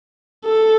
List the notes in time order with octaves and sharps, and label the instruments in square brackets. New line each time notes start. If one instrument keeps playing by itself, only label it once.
[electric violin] A4